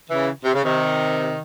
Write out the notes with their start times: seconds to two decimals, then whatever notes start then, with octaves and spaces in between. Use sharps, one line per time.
0.10 C#3 E3
0.44 C3
0.54 C#3
0.64 C3 D#3